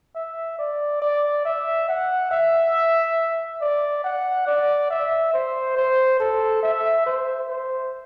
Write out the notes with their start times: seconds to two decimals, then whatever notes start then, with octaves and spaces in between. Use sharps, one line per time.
0.15 E5
0.58 D5
1.02 D5
1.45 E5
1.88 F#5
2.31 E5
3.61 D5
4.04 F#5
4.46 D5
4.90 E5
5.33 C5
5.76 C5
6.20 A4
6.62 E5
7.06 C5
7.49 C5